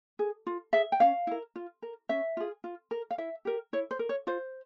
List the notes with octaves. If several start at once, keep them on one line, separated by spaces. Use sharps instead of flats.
G#4
F4
G#4 E5
G5
C#4 F5
E4 A#4
F4
A#4
C#4 E5
F4 G#4
F4
A#4
F5
E4 E5
G4 A#4
E4 C#5
C5
A#4
C#5
F4 C5